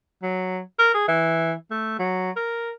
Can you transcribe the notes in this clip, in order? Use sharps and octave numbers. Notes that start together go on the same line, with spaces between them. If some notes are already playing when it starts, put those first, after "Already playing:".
F#3
A#4
G#4
E3
A3
F#3
A#4